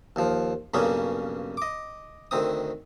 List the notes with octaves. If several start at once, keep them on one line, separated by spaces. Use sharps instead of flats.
D#2 F3
B1 G2 C#3 A#3 C#4 G#4
D#5 D6
D2 D#3 C4 D#6